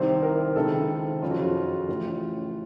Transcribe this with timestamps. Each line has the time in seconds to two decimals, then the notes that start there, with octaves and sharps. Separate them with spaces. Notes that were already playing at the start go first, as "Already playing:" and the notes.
Already playing: C2 C3 D#3 C5
0.23 A#4
0.56 C#2 C3 D#3 A4
1.22 F#1 F2 C#3 F4
1.31 F#4
1.39 F4
1.89 A1 A2